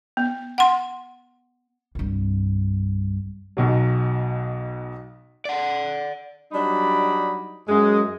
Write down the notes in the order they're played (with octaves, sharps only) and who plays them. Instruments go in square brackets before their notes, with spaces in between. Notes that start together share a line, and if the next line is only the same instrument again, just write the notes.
[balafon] B3
F#5 C6
[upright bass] C2 G2
[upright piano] B1 B2 F#3
[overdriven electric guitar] D5 F#5
[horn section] F#3 G3 D4 D#4 D5 B5
F#2 G#3